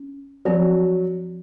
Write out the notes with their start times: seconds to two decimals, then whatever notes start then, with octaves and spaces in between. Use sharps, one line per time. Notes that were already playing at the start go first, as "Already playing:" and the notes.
Already playing: C#4
0.45 F3 F#3 C4 F#4